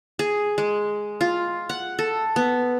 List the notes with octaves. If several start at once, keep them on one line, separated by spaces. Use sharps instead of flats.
G#4
G#3
F4
F#5
A4
B3